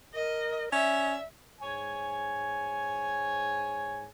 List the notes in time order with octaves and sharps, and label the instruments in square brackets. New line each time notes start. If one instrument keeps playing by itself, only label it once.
[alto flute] A#4 [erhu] D#5
[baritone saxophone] C#4 [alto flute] D5 [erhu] E5
[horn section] G#2 C#5 G#5